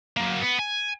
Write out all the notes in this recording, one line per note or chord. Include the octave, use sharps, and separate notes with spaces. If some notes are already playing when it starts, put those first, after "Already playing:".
F#3 A#3
B3
G#5